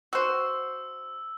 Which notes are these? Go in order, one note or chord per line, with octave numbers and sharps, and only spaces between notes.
F#4 C5 E6